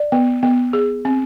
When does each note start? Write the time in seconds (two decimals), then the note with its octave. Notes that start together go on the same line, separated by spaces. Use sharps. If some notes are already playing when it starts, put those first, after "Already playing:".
Already playing: D5
0.12 B3
0.43 B3
0.73 G#4
1.05 C4